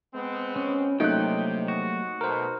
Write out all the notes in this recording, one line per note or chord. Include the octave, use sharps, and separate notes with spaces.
G#3 B3 C4
C#4
A#1 C3 F#3 A3 A#3 D#4 G5 F#6
F#4
B2 A3 A#4 C5